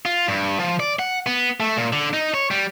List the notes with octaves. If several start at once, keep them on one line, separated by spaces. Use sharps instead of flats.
F4
G2
F3
D5
F#5
B3
A3
A#2
D3
D#4
C#5
G3